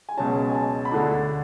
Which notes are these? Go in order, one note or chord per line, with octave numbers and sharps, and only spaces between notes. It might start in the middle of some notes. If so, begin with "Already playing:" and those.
G#5
C#2 B2 F#3 C#4 A5
G#5
A5
B5
D2 D3 A3 D4 A5